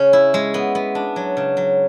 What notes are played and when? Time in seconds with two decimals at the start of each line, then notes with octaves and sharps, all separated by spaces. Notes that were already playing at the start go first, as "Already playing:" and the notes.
Already playing: C#3 C#4
0.13 E4
0.34 G#3
0.54 B3
0.75 B3
0.95 D4
1.16 F#3
1.37 C#3
1.57 F#3